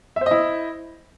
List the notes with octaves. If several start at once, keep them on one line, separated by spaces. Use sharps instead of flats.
E4 C5 D#5 E5